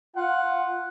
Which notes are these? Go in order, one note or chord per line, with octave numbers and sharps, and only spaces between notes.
F4 F#5